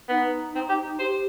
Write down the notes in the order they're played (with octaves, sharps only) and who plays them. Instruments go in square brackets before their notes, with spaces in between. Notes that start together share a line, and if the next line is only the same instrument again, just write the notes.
[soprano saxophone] B3 [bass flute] D#4
[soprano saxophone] C4
G4
[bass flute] G4 [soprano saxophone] C5